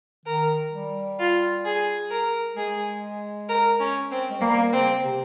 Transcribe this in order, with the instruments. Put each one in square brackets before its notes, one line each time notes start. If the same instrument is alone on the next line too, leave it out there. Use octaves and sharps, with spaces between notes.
[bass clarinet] D#3 [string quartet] A#4
[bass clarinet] G3
[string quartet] F4
G#4
A#4
[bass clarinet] G#3 [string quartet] G#4
[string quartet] A#4
C#4
C4
[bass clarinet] G#3
[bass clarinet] G3 [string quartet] A#3
[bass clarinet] C#3 [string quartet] C4
[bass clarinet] C3